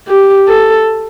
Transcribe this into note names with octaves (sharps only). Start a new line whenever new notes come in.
G4
A4